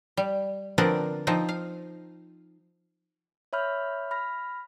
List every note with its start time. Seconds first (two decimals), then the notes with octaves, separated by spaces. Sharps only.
0.17 G3
0.78 D3 F3 B3 C4 A#4 D5
1.27 F3 C4 D#4
1.49 F5
3.53 C#5 E5 B5 F6 G6
4.11 B5 F6 A#6